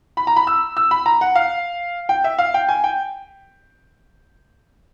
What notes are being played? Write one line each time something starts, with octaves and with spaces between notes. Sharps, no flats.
B5
A#5
B5
E6
E6
B5
A#5
F#5
F5
G5
E5
F5
G5
G#5
G5